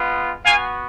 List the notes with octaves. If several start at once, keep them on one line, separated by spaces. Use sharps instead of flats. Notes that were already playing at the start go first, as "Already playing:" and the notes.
Already playing: G#3 B3 F4
B3 F#4 F5 G#5